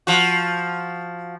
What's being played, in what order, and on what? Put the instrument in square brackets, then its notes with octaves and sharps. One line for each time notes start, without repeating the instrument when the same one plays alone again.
[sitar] F3 F#4